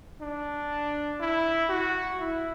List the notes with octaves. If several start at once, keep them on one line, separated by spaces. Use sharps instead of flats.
D4
E4
F#4
E4